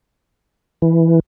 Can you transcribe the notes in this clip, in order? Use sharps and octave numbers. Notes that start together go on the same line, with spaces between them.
E3